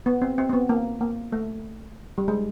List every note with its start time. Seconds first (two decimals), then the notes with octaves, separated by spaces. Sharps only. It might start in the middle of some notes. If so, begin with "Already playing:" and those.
0.06 B3
0.22 C4
0.38 C4
0.49 C4
0.53 B3
0.69 A#3
1.01 A#3
1.32 A3
2.18 G3
2.28 G#3